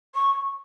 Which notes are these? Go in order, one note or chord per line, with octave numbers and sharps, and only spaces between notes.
C#6